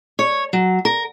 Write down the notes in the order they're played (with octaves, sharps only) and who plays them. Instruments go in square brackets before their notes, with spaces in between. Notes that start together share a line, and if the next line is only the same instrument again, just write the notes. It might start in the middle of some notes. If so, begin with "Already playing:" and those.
[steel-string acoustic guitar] C#5
F#3
A#4